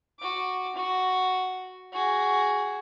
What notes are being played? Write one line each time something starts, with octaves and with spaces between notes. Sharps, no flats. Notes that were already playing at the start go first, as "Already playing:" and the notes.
F#4 D6
F#4
F#4 G#4